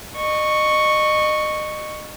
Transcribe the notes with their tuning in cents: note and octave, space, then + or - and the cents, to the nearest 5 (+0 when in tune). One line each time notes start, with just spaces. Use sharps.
D#5 -30 C#6 +0